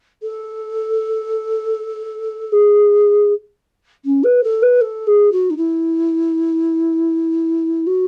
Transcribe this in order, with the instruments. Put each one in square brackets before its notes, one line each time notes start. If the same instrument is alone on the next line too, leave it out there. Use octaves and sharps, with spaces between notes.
[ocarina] A4
G#4
C#4
B4
A4
B4
A4
G#4
F#4
D#4
E4
F#4